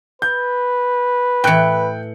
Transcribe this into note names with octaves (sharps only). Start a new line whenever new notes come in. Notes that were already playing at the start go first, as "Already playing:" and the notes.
B4 G6
A2 E3 G5 F#6 C#7